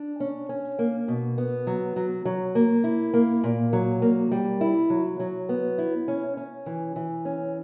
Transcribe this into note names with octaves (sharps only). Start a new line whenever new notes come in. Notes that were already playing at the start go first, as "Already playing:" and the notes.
Already playing: D4
C#4
C#4
A#3
B2
B3
F#3
F#3
F#3
A#3
E4
A#3
A#2
F#3
A#3
G3
E4
F#3
F#3
B3
E4
C#4
C#4
E3
E3
C#4